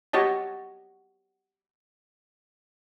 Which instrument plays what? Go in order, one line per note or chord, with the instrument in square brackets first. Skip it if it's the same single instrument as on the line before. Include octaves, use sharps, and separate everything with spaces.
[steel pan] F#4 G4 C#5 D#5 A5